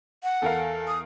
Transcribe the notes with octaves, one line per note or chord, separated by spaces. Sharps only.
F#5
E2 A4 A#4 F5
D#6